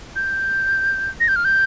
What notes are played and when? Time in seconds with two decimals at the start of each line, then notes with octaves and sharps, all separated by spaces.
0.16 G6
1.20 A#6
1.28 G6
1.36 F6
1.45 G6